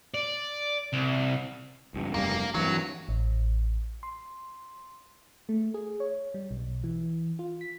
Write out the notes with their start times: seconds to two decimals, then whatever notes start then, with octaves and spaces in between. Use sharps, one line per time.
0.14 D5
0.93 C2
1.94 C#2 G2
2.14 F1 G2 G3 A#3
2.54 G2 E3 F#3
3.09 A1
4.03 C6
5.49 A3
5.74 G#4
6.00 C#5
6.34 G3
6.51 B1
6.84 E3
7.39 F4
7.61 B6